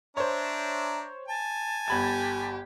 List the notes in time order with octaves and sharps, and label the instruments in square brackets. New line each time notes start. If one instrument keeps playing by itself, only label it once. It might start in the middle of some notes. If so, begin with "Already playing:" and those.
[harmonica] D4 E5 A#5 [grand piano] C5 C#5
[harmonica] G#5 [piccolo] A5
[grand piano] G1 B5 G#6 [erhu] G4